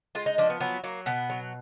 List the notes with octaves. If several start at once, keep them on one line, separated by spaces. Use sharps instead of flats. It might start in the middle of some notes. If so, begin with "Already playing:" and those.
G#3 F4
D#4
F3 D4
B3
F#3 B3
F#3 A#3
B2 B3
F#3